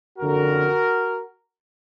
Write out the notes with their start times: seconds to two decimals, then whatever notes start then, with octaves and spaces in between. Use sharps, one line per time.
0.18 F#1 F2 D3 F#4 A#4